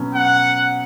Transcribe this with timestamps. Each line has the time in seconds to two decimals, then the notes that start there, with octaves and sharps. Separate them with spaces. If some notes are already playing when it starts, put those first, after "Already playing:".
Already playing: B2 F#3 C#4
0.15 F#5